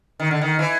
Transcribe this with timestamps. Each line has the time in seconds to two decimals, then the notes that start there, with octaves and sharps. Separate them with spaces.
0.20 D#3
0.31 D3
0.41 D#3
0.59 E3